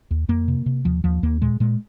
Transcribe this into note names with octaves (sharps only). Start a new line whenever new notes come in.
D#2
F2 A#3
C3
C3
D#2 F3
D#2 F3
D#2 A#3
A#2 G#3
A#2 G#3